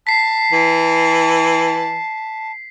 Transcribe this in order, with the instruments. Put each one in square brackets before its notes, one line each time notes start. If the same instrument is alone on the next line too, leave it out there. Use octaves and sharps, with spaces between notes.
[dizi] A5 [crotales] B6 C7
[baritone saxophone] E3